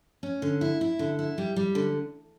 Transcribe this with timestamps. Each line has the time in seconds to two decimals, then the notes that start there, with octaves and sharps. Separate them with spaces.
0.23 C#4
0.42 D3
0.61 E4
0.81 E4
0.99 D3
1.19 E4
1.38 G3
1.56 G3
1.75 D3